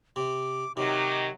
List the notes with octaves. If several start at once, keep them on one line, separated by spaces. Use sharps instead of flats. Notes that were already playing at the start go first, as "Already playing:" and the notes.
C3 D6
C3 D#3 F#3 D#4 D6